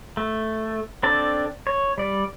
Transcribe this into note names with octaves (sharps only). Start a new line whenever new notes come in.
A3
C4 D4 A4 D5 A5
C#5
G3 D5